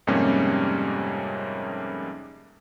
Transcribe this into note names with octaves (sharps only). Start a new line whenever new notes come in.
F2 G#2 C3 G3 A#3 C#4